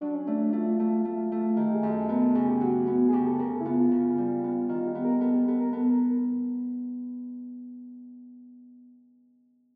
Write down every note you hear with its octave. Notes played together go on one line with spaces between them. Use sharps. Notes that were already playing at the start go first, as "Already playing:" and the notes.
F#3 D4
C#4
A3 D4
A3 F4
A3
A3
A3
D#3 G4
G#4
F#2
A4
B3 A#4
A4
C#3 G#4
G4
F#3 F#4
B3
G#4
C#3 G4
A4
C#3 A#4
A4
E4
B3 F4
C#3
G3
B3
D#3 F4
G4
B3
A#4
B3 A4
G4
B3 A4
A#4
B3 A4
A#4